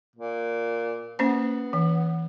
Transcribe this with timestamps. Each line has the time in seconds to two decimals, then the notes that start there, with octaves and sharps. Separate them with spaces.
0.16 A#2
1.19 A#3 B3 C#4 C5
1.73 E3